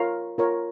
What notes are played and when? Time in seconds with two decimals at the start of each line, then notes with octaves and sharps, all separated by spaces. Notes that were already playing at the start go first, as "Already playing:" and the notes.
Already playing: F4 A#4 C#5 F5
0.38 F4 A#4 C#5